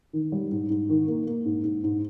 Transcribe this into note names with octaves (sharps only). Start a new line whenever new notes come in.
D#3
G3
G#2
G#2
D#3
A#3
A#3
G#2
G#2
G#2